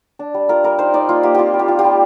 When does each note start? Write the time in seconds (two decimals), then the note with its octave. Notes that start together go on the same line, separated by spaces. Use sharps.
0.19 D4
0.34 G3
0.49 F4 A#4
0.64 G3 A#4
0.78 D#4 C5
0.94 D#4 D5
1.09 A#3 F4
1.23 A#3 G4
1.34 C4 F4 G4
1.54 G3
1.59 G4
1.68 F4
1.79 G4
1.84 G3